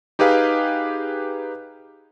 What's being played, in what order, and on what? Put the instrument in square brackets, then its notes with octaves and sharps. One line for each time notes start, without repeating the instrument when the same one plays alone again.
[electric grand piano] D#4 G4 G#4 B4 F5